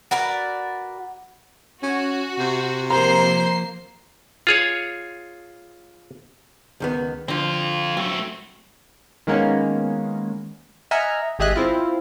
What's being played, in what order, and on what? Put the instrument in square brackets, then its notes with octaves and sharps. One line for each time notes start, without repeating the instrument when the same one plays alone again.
[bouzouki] F#4 A#4 B4 D5
[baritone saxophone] C#4 [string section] F#4
[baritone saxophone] C3
[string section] F3 A#3 C7 [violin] C5 [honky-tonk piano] A#5
[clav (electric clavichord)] F4 G#4 C#5
[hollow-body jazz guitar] C#2 D#3 B3
[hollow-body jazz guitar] D3 F3 [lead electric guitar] C4 F4
[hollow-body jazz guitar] F#3 [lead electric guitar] A3 C4
[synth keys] D#3 G#3 A#3 B3 C#4
D#5 E5 F#5 G#5 A#5 F6
G#1 G4 G#4 D#5 E5 F#6
C4 E4 F4